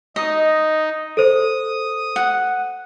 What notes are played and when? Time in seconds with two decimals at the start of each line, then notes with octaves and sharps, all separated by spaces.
0.16 D#4 D#5
1.17 A4 C5 D#6
2.16 F#5